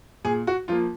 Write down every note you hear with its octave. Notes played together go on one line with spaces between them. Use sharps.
A#2 G#4
F#4
F3 A#3 F4